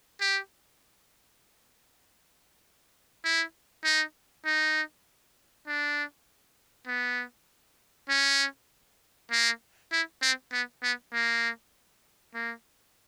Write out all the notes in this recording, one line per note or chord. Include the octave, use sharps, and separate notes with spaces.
G4
E4
D#4
D#4
D4
B3
C#4
A#3
E4
C4
B3
B3
A#3
A#3